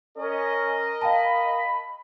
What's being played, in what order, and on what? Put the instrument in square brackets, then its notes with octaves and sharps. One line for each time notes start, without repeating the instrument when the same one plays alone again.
[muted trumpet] C#4 [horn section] A#4 D#5
[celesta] F5 G5 A5 [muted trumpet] B5